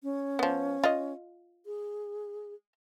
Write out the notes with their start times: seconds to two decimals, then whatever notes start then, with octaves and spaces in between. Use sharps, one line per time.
0.03 C#4
0.39 F3 B3
0.84 F4 D#5
1.66 G#4